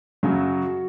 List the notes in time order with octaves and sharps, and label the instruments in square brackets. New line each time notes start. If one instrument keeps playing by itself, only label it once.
[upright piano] F#2 C#3 F#3 F#4